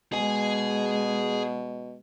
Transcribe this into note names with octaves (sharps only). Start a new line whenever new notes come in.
B2 G#3 G#4 G#5